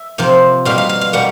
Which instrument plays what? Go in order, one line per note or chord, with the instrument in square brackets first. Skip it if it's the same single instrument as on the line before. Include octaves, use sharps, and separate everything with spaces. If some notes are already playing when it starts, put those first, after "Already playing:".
Already playing: [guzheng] E5
C3 F3 A#3
B2 G3 A#3 F5
F5
F5
F5
B2 G3 A#3 F#5